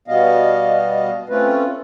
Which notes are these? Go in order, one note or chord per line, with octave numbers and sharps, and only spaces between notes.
B2 G3 B3 D#5 F5
A3 C4 C#4 F4 B4